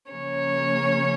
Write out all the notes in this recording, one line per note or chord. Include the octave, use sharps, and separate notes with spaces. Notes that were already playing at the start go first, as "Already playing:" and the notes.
C#3 F3 A#3 C#4 C#5